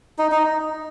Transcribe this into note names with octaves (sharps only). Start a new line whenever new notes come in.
D#4
D#4